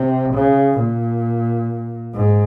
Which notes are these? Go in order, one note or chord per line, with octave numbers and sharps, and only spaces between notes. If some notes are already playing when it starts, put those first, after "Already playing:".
Already playing: C3
C#3
A#2
G#2